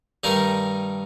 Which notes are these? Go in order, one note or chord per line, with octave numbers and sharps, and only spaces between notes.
G2 D#3 A3 D#4 A#4